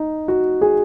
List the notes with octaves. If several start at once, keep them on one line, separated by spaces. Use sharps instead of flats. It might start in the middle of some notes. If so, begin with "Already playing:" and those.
Already playing: D#4
F#4
G#4